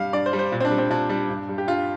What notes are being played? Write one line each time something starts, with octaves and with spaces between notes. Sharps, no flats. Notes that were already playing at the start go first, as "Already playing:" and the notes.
Already playing: G2 G3 F5
G2 D5
C5
G3
C5
A#2
C4
D4
G3
C4
A#2 D4
G3 D4
G2
G3
G4
G2 F4